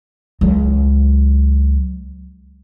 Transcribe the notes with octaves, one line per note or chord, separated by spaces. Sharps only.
C#2 F#3